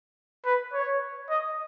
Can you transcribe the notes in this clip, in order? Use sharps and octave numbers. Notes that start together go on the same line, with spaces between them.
B4
C#5
D#5